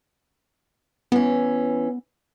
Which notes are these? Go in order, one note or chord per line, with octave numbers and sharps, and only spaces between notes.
E3 B3 C#4